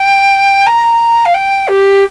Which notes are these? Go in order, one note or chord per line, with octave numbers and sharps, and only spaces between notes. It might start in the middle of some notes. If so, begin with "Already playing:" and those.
Already playing: G5
A#5
F5
G5
G4